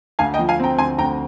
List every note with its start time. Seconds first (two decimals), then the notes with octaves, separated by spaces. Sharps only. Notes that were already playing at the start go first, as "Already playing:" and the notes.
0.19 D2 F5 G#5
0.34 D#5 G5
0.39 F3
0.49 F5 G#5
0.59 C4 G5 A#5
0.79 D2 G#5 C6
0.98 D2 G5 A#5